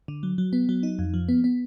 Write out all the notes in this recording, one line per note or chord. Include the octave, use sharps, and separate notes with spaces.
D3
F#3
F#3
B3
F#3
D#4
F2
F3
B3
B3